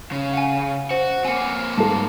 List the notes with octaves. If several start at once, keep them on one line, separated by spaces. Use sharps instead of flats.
C#3
F#5 G#5
F#4 C5
A#3 C4 G#5 C#7
G#2 A4 A5